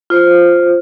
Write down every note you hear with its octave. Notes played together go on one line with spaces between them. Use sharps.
F4 C5